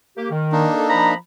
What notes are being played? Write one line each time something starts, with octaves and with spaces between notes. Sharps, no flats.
A#3 G4
D#3
A#3 D4 D#4
A4
F3 A#5 B5